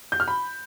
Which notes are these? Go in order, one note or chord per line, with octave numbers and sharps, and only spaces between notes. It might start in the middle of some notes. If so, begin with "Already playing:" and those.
G6
F6
B5